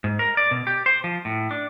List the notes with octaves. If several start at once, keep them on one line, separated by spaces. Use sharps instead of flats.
G#2
A#4
D5
B2
G4
C5
F3
A2
D4